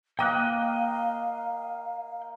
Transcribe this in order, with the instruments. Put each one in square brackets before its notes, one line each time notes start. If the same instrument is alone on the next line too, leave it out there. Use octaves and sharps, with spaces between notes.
[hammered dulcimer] A#3 D#5 [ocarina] F5 [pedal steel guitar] G5 D6 F#6